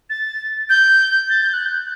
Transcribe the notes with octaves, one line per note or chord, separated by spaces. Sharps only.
A6
G6
A6
G6
F#6
G6